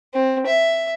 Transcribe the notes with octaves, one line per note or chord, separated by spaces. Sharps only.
C4
E5